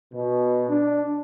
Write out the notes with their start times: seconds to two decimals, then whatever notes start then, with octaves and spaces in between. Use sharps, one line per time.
0.13 B2
0.69 D4